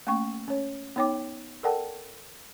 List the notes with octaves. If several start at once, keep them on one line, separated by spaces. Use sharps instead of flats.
A3 A#3 C#4 G5 C#6
C#4 C#5
B3 D#4 C#5 G5 D6
A4 A#4 D5 F#5 G5 A5